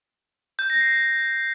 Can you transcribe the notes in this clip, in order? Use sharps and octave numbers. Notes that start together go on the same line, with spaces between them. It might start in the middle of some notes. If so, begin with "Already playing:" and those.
G6
A#6
C7